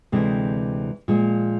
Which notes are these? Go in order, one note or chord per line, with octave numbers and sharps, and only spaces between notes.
D2 C3 E3 G#3 C4
A#2 F3 G#3